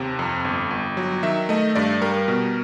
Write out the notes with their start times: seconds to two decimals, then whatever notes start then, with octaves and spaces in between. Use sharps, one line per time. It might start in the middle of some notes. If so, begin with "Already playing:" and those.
Already playing: D#2 C3
0.19 F2
0.45 G1
0.71 G1
0.97 F#3
1.23 D#3 E5
1.49 A3 D#5
1.75 G2 D5
2.02 G3 A#4
2.28 B2